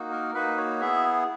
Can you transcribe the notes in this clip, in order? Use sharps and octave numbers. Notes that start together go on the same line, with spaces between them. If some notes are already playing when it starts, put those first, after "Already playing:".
Already playing: A#3 D#4 F#4
A#4
A#3 D#4 F#4 B4
C#5
B3 E4 G#4 E5